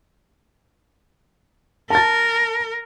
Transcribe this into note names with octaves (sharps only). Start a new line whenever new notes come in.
A#4 A5 A6